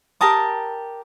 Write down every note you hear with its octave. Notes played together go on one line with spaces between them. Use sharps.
G4 A#4 A5 D#6